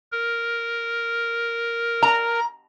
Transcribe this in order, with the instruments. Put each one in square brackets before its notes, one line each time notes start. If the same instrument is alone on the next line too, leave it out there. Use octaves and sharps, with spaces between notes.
[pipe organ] A#4
[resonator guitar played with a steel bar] A#5